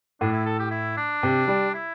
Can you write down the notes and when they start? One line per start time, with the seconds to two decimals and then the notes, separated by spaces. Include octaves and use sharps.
0.21 A2 D4
0.33 E4
0.46 A4
0.59 G4
0.71 E4
0.97 D4
1.23 C3
1.48 G3
1.74 E4